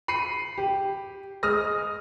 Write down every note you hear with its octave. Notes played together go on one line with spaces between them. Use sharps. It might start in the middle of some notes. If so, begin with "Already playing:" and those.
B5 C7 C#7 D#7
G4
G#3 D#6 F6 A#6